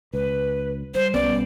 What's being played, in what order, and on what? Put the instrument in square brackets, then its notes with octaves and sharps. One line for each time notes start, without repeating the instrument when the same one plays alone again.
[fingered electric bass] C#2 [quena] B4
[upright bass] G3 [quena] C5
[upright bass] B1 [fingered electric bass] G3 B3 C#4 [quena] D5